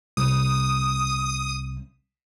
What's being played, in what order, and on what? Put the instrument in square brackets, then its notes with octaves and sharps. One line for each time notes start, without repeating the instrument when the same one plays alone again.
[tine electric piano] C2 [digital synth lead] D#6